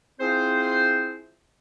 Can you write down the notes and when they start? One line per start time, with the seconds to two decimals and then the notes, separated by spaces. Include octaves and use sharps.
0.20 C4 E4 F4 G#4 C5